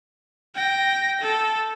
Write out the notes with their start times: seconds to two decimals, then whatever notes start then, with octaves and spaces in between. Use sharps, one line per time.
0.55 G5 A#6
1.21 A4